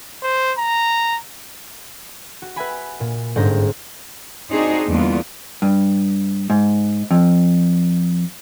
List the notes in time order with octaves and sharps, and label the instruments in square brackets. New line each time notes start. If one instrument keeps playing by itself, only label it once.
[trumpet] C5
A#5
[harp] F#4
B4 E5 G#5 B5
A#2
G1 G#2 C#4 C5 A#5
[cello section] C4 D4 D#4 F#4 G#4 C5
E2 D3 G3 A#3 B3 F4
[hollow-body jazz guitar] G2
G#2
F2